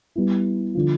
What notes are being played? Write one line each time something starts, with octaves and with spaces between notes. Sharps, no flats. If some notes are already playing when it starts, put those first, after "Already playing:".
G3 B3 E4
D3 F3